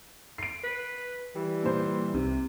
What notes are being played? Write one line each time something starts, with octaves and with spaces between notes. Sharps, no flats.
C7 D7
B4
E3 G3
A#2 C5
C2 C3